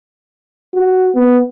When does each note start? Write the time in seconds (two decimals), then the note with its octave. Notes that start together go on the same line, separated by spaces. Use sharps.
0.74 F#4
1.15 B3